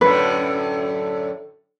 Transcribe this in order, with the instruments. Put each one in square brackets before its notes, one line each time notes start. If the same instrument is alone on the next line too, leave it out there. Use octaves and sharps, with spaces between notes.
[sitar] F#2 A2 D3 [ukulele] B4